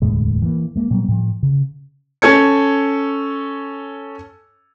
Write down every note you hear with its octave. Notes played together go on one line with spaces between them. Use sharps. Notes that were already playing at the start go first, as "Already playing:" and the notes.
E1 D2 A2 G#3
E3 A#3
G#3 A#3
A#2 F#3 G3 B3
A2 F3
C#3
C#4 A4 G#6 C#7